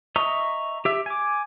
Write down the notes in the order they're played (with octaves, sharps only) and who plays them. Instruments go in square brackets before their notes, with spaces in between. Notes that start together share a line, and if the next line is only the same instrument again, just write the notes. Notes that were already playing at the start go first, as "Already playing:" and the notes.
[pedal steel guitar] D#5 E5 A#5 C#6 D#6
G4 E5
G#5 D6